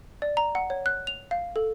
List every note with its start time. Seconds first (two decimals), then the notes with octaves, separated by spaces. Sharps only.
0.22 D5
0.37 A#5
0.55 F#5
0.70 C#5
0.86 F#6
1.07 F7
1.31 F5
1.56 A4